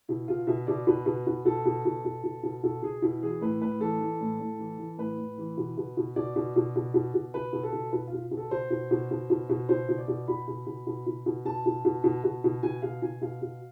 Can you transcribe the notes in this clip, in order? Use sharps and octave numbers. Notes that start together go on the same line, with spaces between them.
B2 E4
B2 F4
B2 E5
B2 D5
B2 B4
B2
B2
B2 A4
B2
B2
B2
B2
B2
B2 A4
B2 G#4
B2 E4
E3 G#4
A2 B4
A2 B4
E3 A4
E3
A2
A2
E3
E3
A2 B4
A2
E3
B2
B2
B2
B2 D5
B2
B2
B2
B2
B2
B2 B4
B2
A4
B2
B2 B4
F4
B2
B2
A4
B2 C5
B2
B2
B2
B2
B2
B2 C5
B2
D5
B2
B2 B5
B2
B2
B2
B2
B2
B2 A5
B2
B2
B2
B2
B2
B2 G#5
B2 F5
B2 G#5
B2 F5
B2